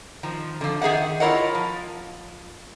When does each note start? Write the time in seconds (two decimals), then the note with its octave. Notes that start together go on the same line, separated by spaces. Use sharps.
0.23 D#3 F3
0.61 D3 F3
0.82 D#3 G#4 E5 F#5
1.20 E4 F4 A#4 C#5 D#5 F#5
1.55 F3